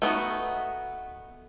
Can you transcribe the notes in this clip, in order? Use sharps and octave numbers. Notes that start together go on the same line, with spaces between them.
A3 B3 D#4 F#4